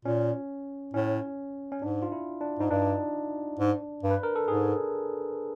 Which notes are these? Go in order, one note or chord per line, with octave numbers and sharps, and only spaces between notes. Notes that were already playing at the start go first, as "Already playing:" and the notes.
A#2 C#4
A2 C#4
C#4
G#2 D4
F4
E4
D4
G#2 D#4
G2 D4
G#2
G2
B4
A#4
A4
G#2 G#4